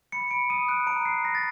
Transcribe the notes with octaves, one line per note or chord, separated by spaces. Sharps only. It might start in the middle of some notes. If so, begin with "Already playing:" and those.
B5 C#7
B5 D7
D#6 D#7
F#6 D7
A#5 D7
C#6 C7
A#5 A#6
A6